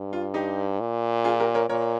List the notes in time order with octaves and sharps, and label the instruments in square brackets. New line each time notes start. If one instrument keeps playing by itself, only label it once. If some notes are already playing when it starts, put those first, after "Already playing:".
Already playing: [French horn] G2
[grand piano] F4
D#4 G4
[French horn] A#2
[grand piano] F4 G#4
G4 A#4
A#4 C#5
[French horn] A#2 [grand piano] A#4 C#5